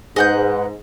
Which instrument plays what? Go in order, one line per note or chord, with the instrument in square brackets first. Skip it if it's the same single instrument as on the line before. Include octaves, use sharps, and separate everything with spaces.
[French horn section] G#2 [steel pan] G#4 [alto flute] B4 [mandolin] D#5 F#5 G6